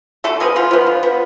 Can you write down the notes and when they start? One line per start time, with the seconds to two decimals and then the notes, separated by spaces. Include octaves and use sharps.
0.24 D3 A3 A4
0.40 F3 G#3 B3 G#4
0.56 D3 F3 F4
0.71 F3 B3
0.86 D3
1.03 F3 B3